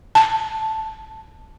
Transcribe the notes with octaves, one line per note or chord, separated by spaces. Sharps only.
A5